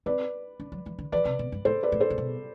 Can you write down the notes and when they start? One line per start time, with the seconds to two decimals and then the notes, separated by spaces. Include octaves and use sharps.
0.06 C4 B4 D5
0.60 D4
0.72 F#3
0.86 E3
0.99 D3
1.12 E3 B4 D5
1.25 C3
1.39 B2
1.52 G2
1.65 A2 A4 C5
1.83 B4 D5
1.92 A2
2.00 A4 C5
2.10 A2
2.18 B2